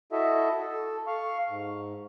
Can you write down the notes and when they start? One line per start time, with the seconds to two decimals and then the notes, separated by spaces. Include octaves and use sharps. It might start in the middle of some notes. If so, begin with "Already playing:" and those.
0.12 E4 F#4 A4 D#5 E5
0.61 A4
1.07 F5 C#6
1.49 G#2